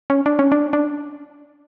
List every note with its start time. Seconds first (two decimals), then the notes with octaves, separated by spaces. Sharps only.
0.10 C#4
0.26 D4
0.39 C#4
0.52 D4
0.73 D4